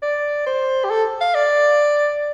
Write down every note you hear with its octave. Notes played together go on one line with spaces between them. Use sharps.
D5
C5
G4
A4
F5
D5